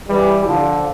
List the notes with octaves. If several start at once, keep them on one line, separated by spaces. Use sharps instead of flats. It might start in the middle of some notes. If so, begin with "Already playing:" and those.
E3 G3
D3 F3